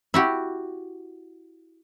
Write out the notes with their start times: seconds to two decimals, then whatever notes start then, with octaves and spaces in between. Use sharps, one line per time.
0.14 E4 F#4 G4